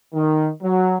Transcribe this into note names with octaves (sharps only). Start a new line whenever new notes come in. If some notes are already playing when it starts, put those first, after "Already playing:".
D#3
F#3